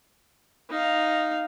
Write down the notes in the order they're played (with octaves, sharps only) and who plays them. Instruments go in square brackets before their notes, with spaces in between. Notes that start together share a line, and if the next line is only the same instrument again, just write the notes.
[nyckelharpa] D#4 F5